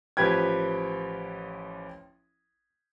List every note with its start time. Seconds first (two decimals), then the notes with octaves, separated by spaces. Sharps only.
0.17 A1 F3 G4 B4 G5 G#6